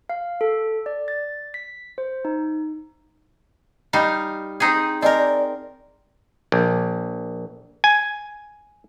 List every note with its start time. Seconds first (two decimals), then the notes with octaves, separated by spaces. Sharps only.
0.09 F5
0.41 A4
0.86 D5
1.08 A6
1.54 B6
1.98 C5
2.25 D#4
3.93 G3 D#4 D#5 F5
4.60 C4 D#4 G#4
5.02 C4 A#4 D5 D#5 G#5 A5
6.52 A#1
7.84 G#5